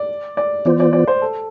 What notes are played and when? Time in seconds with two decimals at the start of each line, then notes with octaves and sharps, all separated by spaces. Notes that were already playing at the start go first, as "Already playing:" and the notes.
Already playing: D5
0.37 D5
0.65 E3 B3 F4 C5 D5
0.80 D5
0.93 D5
1.08 C5
1.22 A4